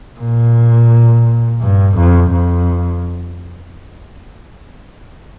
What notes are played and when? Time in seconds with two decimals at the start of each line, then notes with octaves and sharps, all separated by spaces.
0.19 A#2
1.61 G2
1.97 F2
2.32 F2